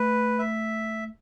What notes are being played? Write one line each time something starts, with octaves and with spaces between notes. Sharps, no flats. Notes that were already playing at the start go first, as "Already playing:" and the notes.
Already playing: A3 B4
E5